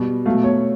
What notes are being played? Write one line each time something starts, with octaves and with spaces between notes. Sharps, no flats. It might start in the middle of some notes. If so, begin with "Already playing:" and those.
Already playing: B2 G3
B2 F#3 A3 F5
C#5